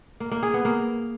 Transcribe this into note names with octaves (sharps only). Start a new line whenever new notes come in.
A#3
A#3
G#4
B3
A#3